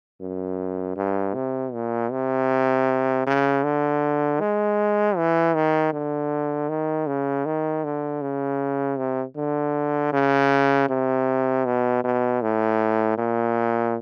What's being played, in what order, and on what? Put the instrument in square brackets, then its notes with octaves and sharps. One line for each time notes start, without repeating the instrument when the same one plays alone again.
[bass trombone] F#2
G2
C3
A#2
C3
C#3
D3
G#3
E3
D#3
D3
D#3
C#3
D#3
D3
C#3
C3
D3
C#3
C3
B2
B2
A2
A#2